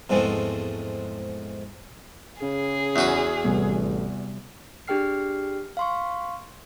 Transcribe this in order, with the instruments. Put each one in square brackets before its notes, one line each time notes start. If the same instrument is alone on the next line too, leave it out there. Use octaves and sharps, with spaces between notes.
[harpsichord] E2 G#2 F3 G#3 A3 C4
[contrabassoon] C#3 [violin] G#4
[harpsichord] E2 F#4 B4
[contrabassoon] A1 [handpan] C3 G3 B3
[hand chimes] D4 G4 G#4 G5 F6 C7
F5 C6 C#6